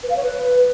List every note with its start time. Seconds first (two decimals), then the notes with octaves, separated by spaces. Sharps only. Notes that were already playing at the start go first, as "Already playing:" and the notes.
0.03 B4
0.10 F5
0.17 C#5
0.23 B4